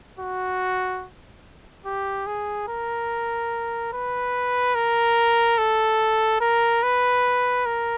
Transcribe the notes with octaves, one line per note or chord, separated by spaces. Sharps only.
F#4
G4
G#4
A#4
B4
A#4
A4
A#4
B4
A#4